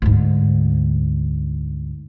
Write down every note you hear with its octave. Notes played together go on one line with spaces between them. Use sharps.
D2 G#2